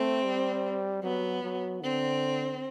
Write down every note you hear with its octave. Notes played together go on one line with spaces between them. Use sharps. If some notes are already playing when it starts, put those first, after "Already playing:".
Already playing: A3 C4
G3
F#3 B3
F#3
D3 C4